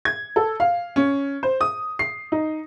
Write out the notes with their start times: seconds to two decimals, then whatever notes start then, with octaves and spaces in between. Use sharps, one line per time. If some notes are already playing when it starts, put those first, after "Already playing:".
0.05 G#6
0.36 A4
0.60 F5
0.96 C#4
1.43 C5
1.61 D#6
1.99 C7
2.32 D#4